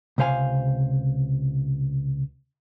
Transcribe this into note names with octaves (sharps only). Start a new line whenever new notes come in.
C#2 C3 C5 F5 G#5